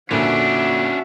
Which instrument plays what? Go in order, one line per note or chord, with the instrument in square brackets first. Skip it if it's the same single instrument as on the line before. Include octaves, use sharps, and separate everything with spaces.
[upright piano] F2 A#2 D3 [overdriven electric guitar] C#4 D4 [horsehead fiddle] F#4 E5